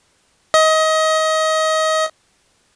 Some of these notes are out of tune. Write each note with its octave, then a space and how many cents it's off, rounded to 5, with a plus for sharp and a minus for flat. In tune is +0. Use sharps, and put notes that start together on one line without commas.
D#5 +25